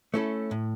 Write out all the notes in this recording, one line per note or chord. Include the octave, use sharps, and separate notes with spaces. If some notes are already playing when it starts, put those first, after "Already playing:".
A3 C#4 E4 A4
A2